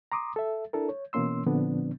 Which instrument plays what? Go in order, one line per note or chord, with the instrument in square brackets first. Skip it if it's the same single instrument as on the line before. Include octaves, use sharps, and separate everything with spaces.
[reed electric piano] A#5 C6 D6 D#6
A4 E5
D4 E4 A4 A#4
C#5
B2 E3 A#3 C#4 C6 E6
A#2 D3 F3 B3 C4 D4